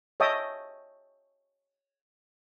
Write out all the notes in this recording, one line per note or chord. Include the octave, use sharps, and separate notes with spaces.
C#5 D#5 E5 G5 A5 D#6